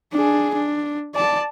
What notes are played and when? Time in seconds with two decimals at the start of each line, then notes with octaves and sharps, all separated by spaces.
0.12 D4 G#4
0.55 D4
1.15 D5 A5